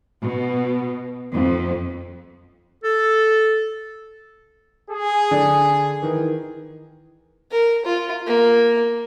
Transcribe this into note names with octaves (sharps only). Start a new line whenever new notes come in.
B2
F2
A4
G#4
D3 D4
D#3 E3
A#4
F4
A#3